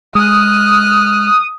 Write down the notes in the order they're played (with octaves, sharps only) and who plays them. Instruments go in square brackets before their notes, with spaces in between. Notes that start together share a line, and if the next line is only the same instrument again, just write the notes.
[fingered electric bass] G#3 [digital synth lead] D#6 [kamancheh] F6 F#6